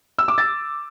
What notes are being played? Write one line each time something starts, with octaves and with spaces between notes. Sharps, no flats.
E6
D6
A6